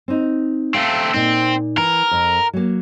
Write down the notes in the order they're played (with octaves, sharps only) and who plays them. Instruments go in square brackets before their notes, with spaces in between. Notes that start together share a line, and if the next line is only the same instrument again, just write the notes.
[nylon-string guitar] C4 D#4
[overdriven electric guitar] A3 C4 [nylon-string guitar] F5
[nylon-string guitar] A#2 D#4 [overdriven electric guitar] C4
[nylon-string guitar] E3 [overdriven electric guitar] A#4
[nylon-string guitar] F2
F#3 A#3